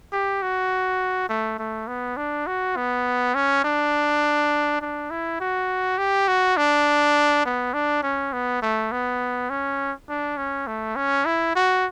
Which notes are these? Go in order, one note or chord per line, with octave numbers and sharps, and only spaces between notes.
G4
F#4
A3
A3
B3
D4
F#4
B3
C#4
D4
D4
E4
F#4
G4
F#4
D4
B3
D4
C#4
B3
A3
B3
C#4
D4
C#4
A3
C#4
E4
F#4